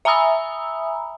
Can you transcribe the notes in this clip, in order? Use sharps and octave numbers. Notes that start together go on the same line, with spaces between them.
E5 G#5 A#5 B5 D#6 E6